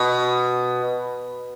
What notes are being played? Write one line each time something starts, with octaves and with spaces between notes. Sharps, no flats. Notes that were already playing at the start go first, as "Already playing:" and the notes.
Already playing: B2